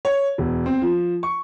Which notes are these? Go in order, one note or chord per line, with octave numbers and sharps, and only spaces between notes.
C#5
E1
C4
F3
C#6